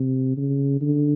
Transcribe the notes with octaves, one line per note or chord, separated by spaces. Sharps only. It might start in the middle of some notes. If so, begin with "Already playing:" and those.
Already playing: C3
C#3
D3